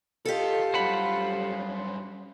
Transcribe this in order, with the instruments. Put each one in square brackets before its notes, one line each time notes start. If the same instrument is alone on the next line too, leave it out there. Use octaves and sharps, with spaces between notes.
[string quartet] F4 [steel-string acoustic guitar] G4 A4 [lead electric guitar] A#4 D#5
[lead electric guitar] F#2 G3 [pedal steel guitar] C5 F#5 B5